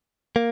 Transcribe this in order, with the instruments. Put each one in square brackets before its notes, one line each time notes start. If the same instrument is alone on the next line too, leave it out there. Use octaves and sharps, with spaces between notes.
[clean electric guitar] A#3